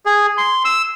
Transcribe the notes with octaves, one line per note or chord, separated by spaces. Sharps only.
G#4
C6
E6